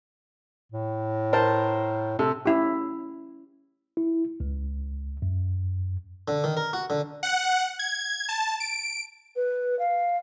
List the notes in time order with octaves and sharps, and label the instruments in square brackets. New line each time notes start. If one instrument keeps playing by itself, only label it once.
[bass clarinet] A2
[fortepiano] A#4 C5 A5
[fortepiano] C3 [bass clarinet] A4
[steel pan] C#4 E4 G4
[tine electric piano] E4
C#2
F#2
[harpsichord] D3
D#3
A#4
F#4
D3
[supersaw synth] F#5
G#6
A5
D7
[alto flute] B4
F5